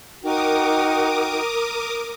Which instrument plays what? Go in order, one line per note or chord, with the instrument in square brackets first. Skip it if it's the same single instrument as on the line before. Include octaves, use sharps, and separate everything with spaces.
[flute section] D#4 F#4 G5 [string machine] A#4 D6 D#6